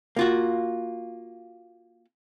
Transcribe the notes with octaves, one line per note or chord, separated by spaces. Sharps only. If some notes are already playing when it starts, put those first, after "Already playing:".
A#3 F4 F#4